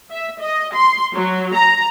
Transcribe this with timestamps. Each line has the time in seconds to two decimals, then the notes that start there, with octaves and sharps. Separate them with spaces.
0.11 E5
0.40 D#5
0.75 C6
1.15 F#3
1.55 A#5